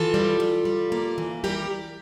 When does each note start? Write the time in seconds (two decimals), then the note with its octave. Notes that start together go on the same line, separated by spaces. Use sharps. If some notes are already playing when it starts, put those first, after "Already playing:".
Already playing: E3 F4 A4
0.14 G3
0.40 G3
0.65 G3
0.92 A#3
1.18 E3
1.44 G3 G4 A#4